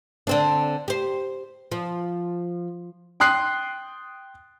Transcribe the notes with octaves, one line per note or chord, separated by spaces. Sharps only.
D3 C4 D4
G4 C5
F3
G5 C6 D#6 F#6 C7